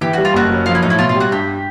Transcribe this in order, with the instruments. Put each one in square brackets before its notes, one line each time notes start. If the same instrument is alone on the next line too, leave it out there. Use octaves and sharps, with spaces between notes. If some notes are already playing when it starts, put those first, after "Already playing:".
[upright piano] E3 [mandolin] G4
[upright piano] G3 [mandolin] F#4
[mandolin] F4
[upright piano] F#1 [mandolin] F#4
[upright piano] F#3
[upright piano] F3 [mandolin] F4
[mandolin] E4
[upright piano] A2 [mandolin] D#4
[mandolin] E4
[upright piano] B2 [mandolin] F4
[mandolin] F4
[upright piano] G3 [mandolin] F#4
[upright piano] G2 [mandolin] G4